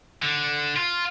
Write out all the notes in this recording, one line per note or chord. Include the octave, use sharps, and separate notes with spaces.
D3
F4